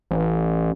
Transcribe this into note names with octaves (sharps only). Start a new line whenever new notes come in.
A1